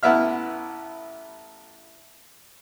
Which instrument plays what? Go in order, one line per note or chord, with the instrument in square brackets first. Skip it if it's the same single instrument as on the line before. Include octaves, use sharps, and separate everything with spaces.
[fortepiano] A1 B3 E4 E5 F6